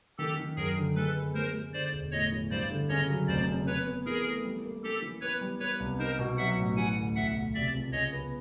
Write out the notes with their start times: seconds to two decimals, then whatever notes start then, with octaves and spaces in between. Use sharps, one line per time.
0.18 D#3 G4 A4
0.37 D#3
0.56 F#2 G#4 A#4
0.77 D3
0.96 G#3 A4 B4
1.15 B3
1.34 G#3 A#4 C5
1.54 G#3
1.73 D3 C5 D5
1.92 E1
2.12 A2 C#5 D#5
2.32 E3
2.51 G2 C5 D5
2.70 D3
2.89 C#3 C#5 D#5
3.08 F#3
3.28 F1 C5 D5
3.48 C#3
3.66 B3 B4 C#5
3.86 B3
4.06 E3 G#4 A#4
4.24 A3
4.44 G3
4.64 A#3
4.83 C#4 G4 A4
5.02 E3
5.21 B3 B4 C#5
5.41 G3
5.60 B3 B4 C#5
5.80 C2
5.99 D#4 A#4 C5
6.19 B2
6.37 F#3 E5 F#5
6.58 A1
6.77 E3 F#5 G#5
6.97 D2
7.15 B1 E5 F#5
7.35 B1
7.55 C3 D5 E5
7.73 C#2
7.92 C#3 C#5 D#5
8.12 B3